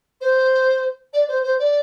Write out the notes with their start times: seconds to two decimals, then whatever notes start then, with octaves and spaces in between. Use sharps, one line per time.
0.21 C5
1.13 D5
1.28 C5
1.44 C5
1.59 D5